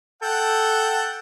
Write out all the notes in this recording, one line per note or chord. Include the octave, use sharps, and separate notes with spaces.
A4 F#5 G5